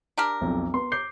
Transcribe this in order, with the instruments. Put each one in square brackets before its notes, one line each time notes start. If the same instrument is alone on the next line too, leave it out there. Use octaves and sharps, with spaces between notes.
[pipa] D4 G4 A#4
[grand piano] B1 F2
B3 C6
D6 G6 C7